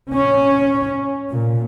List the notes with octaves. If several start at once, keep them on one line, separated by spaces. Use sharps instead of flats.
C#4
A#2